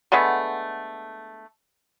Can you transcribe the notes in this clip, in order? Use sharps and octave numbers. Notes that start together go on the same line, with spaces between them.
D3 G#3 A3 B3